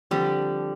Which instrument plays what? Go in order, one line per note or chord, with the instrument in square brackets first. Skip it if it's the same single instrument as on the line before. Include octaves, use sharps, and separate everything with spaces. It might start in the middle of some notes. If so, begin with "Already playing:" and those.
[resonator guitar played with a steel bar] D3 G3 [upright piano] F3 C4 G4